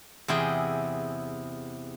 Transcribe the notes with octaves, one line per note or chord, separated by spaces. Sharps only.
E2 C3 E4 G#4 G5